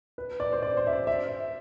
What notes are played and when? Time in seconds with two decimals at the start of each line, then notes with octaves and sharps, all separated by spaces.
0.18 B4
0.40 D5
0.53 C5
0.62 D5
0.77 C5
0.87 E5
0.93 D5
1.07 E5